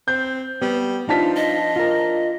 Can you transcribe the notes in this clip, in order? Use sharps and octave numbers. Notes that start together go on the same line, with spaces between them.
C4 G6
G3 B3
F3 D4 D#4 F4 A5 B6
D#5
F4 A#4